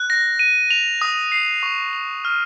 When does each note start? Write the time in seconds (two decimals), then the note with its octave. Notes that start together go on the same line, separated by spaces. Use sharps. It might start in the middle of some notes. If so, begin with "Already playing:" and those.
Already playing: F#6
0.10 A#6
0.39 D#7
0.71 F7
1.01 D#6
1.32 C7
1.63 C#6
1.93 F7
2.25 F6